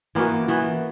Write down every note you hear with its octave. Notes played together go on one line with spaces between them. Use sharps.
E3 A#3 B3 F#4
E3 B3 F#4